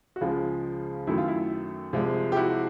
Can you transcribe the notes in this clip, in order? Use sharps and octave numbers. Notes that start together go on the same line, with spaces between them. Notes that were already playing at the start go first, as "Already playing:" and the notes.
F#4
C#2 C#3 F3 G#3 F4
F#2 D#3 F#3 A3 E4
F4
E4
C2 C3 F3 G#3
G4
E4 F#4